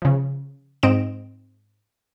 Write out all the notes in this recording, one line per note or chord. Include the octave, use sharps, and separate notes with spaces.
C#3 F3
G#2 C4 D#5 D7 E7